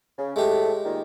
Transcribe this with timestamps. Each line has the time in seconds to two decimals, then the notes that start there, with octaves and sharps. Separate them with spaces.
0.17 C#3
0.36 A2 G#3 A3 G4
0.84 A#2 D#3